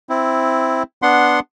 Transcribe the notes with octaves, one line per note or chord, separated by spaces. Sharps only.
C4 E4
B3 D4 F#5 C6